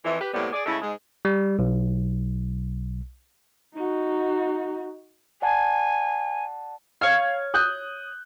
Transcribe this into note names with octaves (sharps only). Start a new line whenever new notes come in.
F2 E3
G4 B4
A2 C3 G3 A#3 B3
G#4 D5
C#3 G#3 A3 E4
G#2 G#3
G3
B1
D#4 F#4
D5 F#5 G#5 A5
C#5 F5 F6
D#6 F#6 G6